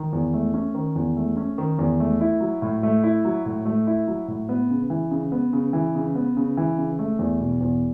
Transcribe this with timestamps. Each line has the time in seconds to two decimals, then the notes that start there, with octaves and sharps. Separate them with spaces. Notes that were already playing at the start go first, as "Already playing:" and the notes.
Already playing: D#3
0.13 E2
0.34 A3
0.54 C#4
0.75 D#3
0.96 E2
1.17 A3
1.37 C#4
1.58 D#3
1.79 E2
2.00 A3
2.21 E4
2.41 F#3
2.62 A2
2.83 A3
3.04 E4
3.25 F#3
3.46 A2
3.66 A3
3.87 E4
4.08 F#3
4.28 A2
4.49 B3
4.70 C#3
4.90 E3
5.11 C#3
5.32 B3
5.53 C#3
5.73 E3
5.95 C#3
6.15 B3
6.37 C#3
6.57 E3
6.78 C#3
6.99 A3
7.19 E2
7.40 B2
7.61 E2